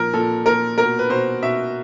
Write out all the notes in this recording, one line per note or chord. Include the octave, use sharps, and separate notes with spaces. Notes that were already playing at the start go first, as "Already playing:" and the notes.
Already playing: A#2 F3 A#4
A#2 A4
A#2 A#4
B2 A#4
B4
B2 C5
B2 E5